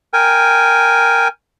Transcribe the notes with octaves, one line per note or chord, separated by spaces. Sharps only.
A#4 G5 G#5